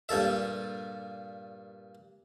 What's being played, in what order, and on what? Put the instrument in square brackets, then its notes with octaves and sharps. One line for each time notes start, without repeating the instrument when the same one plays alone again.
[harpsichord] G2 A#2 A4 E5